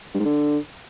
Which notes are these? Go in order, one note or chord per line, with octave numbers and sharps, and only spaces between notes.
G2
G#2
D3